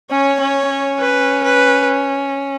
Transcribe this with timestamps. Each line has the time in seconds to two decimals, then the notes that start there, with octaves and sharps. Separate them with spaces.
0.10 C#4 C#5
0.40 C#4
0.70 C#4
0.99 B4
1.44 B4